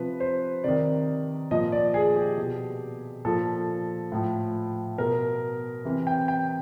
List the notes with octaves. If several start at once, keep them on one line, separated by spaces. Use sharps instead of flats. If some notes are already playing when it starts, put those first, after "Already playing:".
Already playing: C3 F3 B4
C5
C3 D#3 D5
A#2 F3 D#5
D5
G#4
G4
B2
A#2 F3 A4
A2 F3
B2 A#4
C3 E3
G5
G5